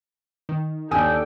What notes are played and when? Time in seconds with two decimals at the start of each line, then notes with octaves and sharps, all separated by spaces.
0.49 D#3
0.91 D#2 D4 A4 G5 G#5 D#6